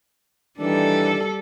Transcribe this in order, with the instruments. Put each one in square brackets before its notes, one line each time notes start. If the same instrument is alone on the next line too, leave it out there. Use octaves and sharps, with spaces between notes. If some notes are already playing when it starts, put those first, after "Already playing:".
[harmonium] D#3 E3 D4 [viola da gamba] G3 A4